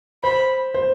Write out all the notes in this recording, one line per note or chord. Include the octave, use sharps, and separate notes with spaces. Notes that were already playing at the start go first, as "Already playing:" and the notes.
C5 B5
C5